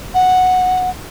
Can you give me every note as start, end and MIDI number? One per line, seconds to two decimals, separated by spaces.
0.14 0.90 78